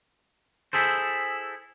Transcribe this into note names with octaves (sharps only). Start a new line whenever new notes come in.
E4 G#4 A4 C5